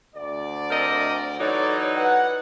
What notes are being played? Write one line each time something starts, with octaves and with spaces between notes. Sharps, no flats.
D2 D5
C4 A#4 D#5
E3 F#3 D#4 A4 C#5 D5
B4 F#5